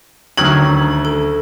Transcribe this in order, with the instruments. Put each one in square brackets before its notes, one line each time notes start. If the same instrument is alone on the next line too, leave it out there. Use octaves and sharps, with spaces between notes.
[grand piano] D2 F#7 [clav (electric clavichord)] D#3 F#3 C#4 [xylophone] G#6
[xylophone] A4